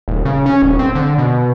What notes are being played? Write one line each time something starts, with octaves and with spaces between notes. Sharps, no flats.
D#1
C#3
C#4
D#1
C4
D3
B2